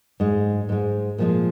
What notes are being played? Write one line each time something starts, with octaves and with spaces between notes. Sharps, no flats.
G#2 G#3
G#2 G#3
A#2 F3 G#3